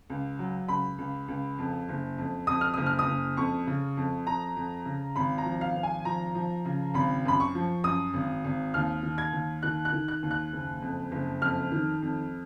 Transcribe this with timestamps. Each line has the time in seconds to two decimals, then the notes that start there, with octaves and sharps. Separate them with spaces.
0.10 C#2
0.39 F#3
0.68 C#2 B5
0.98 C#2
1.28 C#2
1.58 F2
1.89 F#1
2.18 F2
2.47 F2 D#6
2.61 F6
2.74 F#1 D#6
2.86 F6
2.99 D#6
3.07 F#1
3.37 F2 C#6
3.67 C#3
3.97 F2
4.26 F2 A#5
4.56 F2
4.85 C#3
5.16 G#1 B5
5.38 A#5
5.45 F3
5.61 F5
5.76 G#1
5.83 G#5
6.05 F3 A#5
6.35 F3
6.65 C#3
6.94 G#1 B5
7.25 F#2 B5
7.40 C#6
7.55 F3
7.84 F#2 D#6
8.14 G#1
8.44 G#1
8.74 D#2 F6
9.03 D#3
9.18 G#6
9.33 D#2
9.63 D#3 F#6
9.85 F#6
9.93 D#3
10.08 F#6
10.23 D#2
10.31 F#6
10.53 F#1
10.82 F2
11.11 F#1
11.42 F2 F6
11.72 D#3
12.02 F2